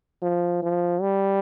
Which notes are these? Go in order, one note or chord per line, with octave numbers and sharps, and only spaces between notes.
F3
F3
G3